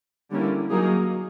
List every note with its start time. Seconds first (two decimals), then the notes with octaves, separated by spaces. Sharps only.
0.30 D3 G3 A#3 C#4 E4
0.70 F#3 A#3 D#4 G#4